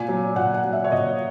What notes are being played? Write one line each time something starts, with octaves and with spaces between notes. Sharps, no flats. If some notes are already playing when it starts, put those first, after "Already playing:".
Already playing: A#2 G#5
F#3
A#2 F#5
F#5
F#3
E5
C#5
A#2 D#5